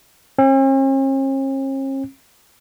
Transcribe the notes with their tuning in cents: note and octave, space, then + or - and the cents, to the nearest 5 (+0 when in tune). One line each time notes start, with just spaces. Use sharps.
C#4 -45